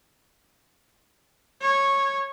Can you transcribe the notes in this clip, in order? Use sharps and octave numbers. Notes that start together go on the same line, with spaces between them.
C#5